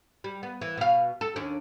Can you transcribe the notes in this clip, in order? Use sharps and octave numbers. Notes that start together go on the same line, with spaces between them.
G3
B3
E3
B2 F5
A4
D#2 C#4 D4